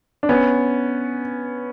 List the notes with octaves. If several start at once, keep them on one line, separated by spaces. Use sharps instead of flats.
D4
B3 C#4